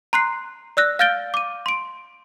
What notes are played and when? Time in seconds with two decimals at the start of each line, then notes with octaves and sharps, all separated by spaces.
0.13 A#5 C6 F#6 C7
0.77 D5 E6 F#6 A#6
0.99 F5 F6 G6 A6 D7 G7
1.34 D6 D#7
1.66 C6 D7